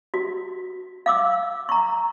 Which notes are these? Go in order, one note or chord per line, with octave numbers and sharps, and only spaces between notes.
F#4
F5 D6 E6
A#5 C#6